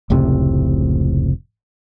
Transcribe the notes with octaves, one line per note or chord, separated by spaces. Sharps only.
F1 C#2 A2 C3